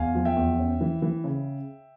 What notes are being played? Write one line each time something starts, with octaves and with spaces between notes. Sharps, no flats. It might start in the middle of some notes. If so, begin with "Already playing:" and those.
Already playing: E2 F5 G#5
F3
E5 G5
E2
C#4
E3
E3
C#3